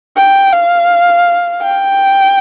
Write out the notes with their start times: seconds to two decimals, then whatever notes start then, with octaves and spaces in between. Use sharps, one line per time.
0.17 G5
0.53 F5
1.62 G5